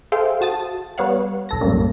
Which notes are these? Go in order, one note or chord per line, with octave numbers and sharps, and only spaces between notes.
G#4 A4 C5 E5 F5 G5
F#4 A5 D#6 A6
G3 B3 C#5 F5 F#5
B1 A4 A#6
F#2 A2 G3 A#3 C#4